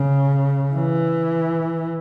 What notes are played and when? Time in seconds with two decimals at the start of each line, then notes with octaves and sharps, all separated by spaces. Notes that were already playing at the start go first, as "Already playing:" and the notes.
Already playing: C#3
0.75 E3